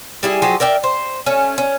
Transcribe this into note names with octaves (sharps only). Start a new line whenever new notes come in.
G3 E4 G#4
F3 F#3 G4 G#4
A#4 D5 E5 G5
C5
A3 C#4
C#4